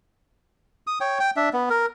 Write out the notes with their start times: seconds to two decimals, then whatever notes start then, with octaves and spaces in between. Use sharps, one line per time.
0.87 D#6
1.01 C#5 G5
1.20 G5
1.37 D4 E5
1.53 B3
1.70 A#4